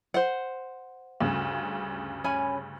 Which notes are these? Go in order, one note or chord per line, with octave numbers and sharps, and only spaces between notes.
C5 F#5
D2 G2 C#3
C#4 G#5 B5